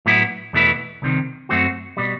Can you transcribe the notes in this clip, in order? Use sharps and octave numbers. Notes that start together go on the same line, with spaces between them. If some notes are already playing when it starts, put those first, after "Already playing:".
A2 F#3 B3 E4
E2 B2 A3 E4 B4
C2 C3 D#3
F#2 F#3 A3 C4 F#4
B2 G3